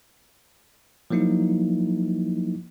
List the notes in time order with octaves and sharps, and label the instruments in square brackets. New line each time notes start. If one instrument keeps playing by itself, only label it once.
[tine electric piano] F3 F#3 A#3 D#4 E4